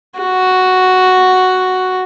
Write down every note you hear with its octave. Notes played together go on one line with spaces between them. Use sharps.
F#4